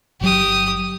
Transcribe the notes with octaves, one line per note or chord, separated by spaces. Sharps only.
G1 F#3 G4 D#6